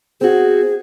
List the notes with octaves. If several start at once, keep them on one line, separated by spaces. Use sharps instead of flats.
C4 F#4 G#4